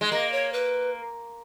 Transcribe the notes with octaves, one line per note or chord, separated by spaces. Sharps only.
G#3
A#3 D#5
C#5
B4